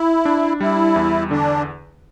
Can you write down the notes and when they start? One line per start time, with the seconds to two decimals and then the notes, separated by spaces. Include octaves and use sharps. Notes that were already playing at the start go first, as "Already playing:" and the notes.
Already playing: E4
0.25 D4
0.60 G3 E4
0.96 E2
1.31 D3 D4